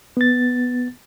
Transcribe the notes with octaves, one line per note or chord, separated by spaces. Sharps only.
B3 A6